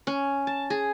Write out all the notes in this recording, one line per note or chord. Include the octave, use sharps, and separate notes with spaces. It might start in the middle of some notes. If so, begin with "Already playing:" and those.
C#4
A5
G#4